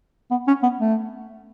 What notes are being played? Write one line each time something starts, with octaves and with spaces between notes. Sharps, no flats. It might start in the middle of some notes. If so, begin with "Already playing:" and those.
B3
C#4
B3
A3